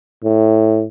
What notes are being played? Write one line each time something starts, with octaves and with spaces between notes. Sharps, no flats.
A2